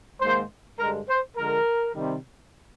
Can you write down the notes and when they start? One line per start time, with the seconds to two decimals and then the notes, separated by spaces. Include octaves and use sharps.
0.21 G#2 D#3 A#3 C5
0.79 G2 D3 G#3 A#4
1.08 C5
1.37 D3 F3 G#3 A#4
1.95 C3 D#3 G3